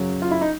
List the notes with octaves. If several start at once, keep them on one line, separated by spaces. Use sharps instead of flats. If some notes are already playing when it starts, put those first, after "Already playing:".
Already playing: F#2 C#3 F#3
F4
E4
D#4